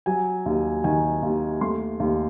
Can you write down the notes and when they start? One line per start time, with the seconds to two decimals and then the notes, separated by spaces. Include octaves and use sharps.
0.06 F#3 G#5
0.46 D#2
0.84 D#3 G#5
1.23 D#2
1.61 A3 C6
2.00 D#2